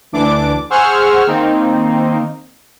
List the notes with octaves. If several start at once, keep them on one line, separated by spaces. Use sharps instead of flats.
D2 E3 D4 D6
G#4 C5 F#5 C#6 E6 F6
D#3 A#3 C4 D#4